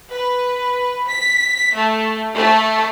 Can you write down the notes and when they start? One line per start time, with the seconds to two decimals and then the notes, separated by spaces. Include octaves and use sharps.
0.10 B4
1.09 B6
1.76 A3
2.35 A3